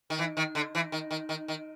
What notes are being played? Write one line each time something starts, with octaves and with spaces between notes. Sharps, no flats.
D#3
E3
D#3
D3
E3
D#3
D#3
D#3
D#3